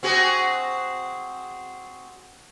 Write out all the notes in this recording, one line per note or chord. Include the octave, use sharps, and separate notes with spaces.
C4 F#4 G#4